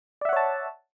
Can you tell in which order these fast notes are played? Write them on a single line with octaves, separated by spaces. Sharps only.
D5 E5 F#5 C#5 A5